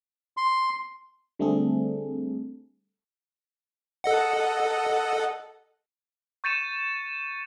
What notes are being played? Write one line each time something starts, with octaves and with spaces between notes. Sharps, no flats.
C6
D3 G3 A3 C4 G#4 A4
A4 D#5 F#5
C#6 G6 A6 C#7 D#7 E7